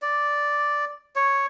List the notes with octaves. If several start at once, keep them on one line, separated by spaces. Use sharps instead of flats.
D5
C#5